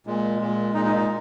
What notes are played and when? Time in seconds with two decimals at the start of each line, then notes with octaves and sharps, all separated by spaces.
0.07 A#2 G#3
0.40 A#2 G#3
0.74 A#2 G#3 D#4
0.85 D#4
0.96 D#4